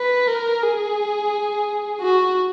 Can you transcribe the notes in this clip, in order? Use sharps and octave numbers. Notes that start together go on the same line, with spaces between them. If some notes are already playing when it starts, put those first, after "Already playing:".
Already playing: B4
A#4
G#4
F#4